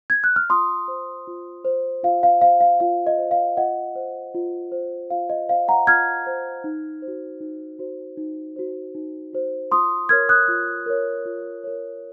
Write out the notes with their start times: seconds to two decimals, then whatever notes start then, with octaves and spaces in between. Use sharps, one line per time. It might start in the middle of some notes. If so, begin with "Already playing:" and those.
0.10 G#6
0.24 F#6
0.36 F6
0.50 F4 C6 D#6
0.88 C5
1.27 F4
1.65 C5
2.03 F4 F5
2.23 F5
2.41 C5 F5
2.61 F5
2.80 F4 F5
3.07 D#5
3.18 C5
3.31 F5
3.57 F4 D#5 F#5
3.95 C5
4.35 F4
4.72 C5
5.10 F4 F5
5.30 D#5
5.49 C5 F5
5.68 F#5 A#5
5.87 F4 F6 G#6
6.27 C5
6.64 D#4
7.02 C5
7.08 F#4
7.41 D#4
7.79 F#4 C5
8.17 D#4
8.56 F#4 C5
8.95 D#4
9.33 F#4 C5
9.71 F4 C6 D#6
10.09 A#4 C#5 F6 G#6
10.29 D#6 F#6
10.48 F4
10.86 A#4 C#5
11.26 F4
11.64 A#4 C#5